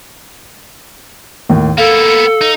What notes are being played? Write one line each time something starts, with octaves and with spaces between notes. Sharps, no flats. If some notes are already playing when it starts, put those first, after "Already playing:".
D#2 A2 D#3
A#3 B3 A4 F5
D#4